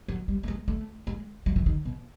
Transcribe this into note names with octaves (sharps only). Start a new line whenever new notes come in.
F#3
G3
A3
G#3
A3
G#3
F#3
E3
D#3
B2